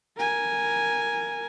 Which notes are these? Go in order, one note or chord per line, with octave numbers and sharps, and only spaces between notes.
A#4 G#5